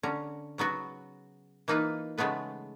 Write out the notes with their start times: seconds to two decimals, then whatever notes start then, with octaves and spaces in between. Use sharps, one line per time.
0.03 D3 C#4 A#5
0.58 C#3 F#3 B3 F#4
1.68 E3 A#3 D#4 F4 B4
2.18 C#3 G#3 A3 B3 B4